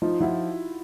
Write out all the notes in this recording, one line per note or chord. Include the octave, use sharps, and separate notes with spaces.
F3 D#4 F4
F3 E4 F#4